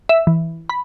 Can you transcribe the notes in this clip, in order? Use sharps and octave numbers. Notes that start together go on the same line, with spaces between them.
E5
E3
B5